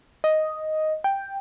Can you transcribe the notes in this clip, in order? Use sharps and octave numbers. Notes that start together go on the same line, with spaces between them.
D#5
G5